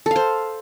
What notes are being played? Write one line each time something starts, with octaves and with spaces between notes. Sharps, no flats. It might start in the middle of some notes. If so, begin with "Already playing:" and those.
A4 C5 F5